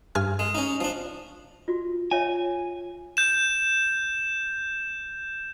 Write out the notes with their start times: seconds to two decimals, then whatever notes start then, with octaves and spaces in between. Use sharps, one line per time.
0.15 G2 G#5 F6
0.39 G#3
0.55 C#4 D#4
0.80 F3 D4
1.68 F4 F#4
2.11 F4 C#5 E5 G#5
3.17 G6 E7